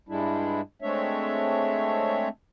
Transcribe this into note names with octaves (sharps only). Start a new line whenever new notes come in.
G2 G3 G#3 D4 E4
G#3 A3 C4 D4 C#5 E5